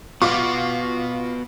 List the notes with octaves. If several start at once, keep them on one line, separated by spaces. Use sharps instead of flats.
B3 F4 F#4 C#6 D6